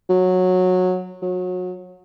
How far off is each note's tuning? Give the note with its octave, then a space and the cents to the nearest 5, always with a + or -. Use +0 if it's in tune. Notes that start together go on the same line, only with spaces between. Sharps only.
F#3 -15
F#3 -30